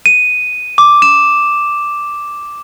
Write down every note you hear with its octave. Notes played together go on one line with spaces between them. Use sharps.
D#7
D6
E7